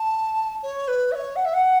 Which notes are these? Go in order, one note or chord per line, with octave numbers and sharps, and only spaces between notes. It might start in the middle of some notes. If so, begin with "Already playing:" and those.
Already playing: A5
C#5
B4
E5
C#5
F#5
E5
F#5